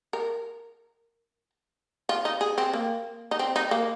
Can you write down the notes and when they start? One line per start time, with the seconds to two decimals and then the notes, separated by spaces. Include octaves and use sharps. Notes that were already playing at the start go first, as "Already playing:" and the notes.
0.13 A#4
2.09 F4
2.25 D#4
2.41 G#4
2.58 C4
2.73 A#3
3.31 D#4
3.39 C4
3.56 D#4
3.71 A#3